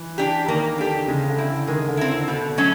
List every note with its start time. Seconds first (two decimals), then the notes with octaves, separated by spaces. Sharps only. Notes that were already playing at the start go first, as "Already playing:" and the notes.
Already playing: E3
0.18 D4 G4
0.48 D#3 A#3
0.78 D3 D4 G4
1.08 C#3 G#3
1.28 D3
1.38 C4 E4
1.48 D3
1.67 D#3 G#3
1.88 D3
1.97 C4 E4
2.08 D3
2.28 B2 D3
2.48 D3
2.58 F#3 A3 C#4